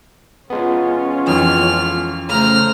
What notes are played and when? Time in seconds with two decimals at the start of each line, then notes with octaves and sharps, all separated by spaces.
0.50 G#3 B3 C#4 F4
1.27 F2 E3 F6
2.29 C#3 A3 C5 A#5 F6